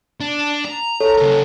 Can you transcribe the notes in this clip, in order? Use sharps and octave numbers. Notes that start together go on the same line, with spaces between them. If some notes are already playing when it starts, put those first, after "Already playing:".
D4
A#5
A4 C#5
C#3 A#4